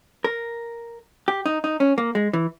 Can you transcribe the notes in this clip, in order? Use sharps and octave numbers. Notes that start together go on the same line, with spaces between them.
A#4
G4
D#4
D#4
C#4
A#3
G#3
E3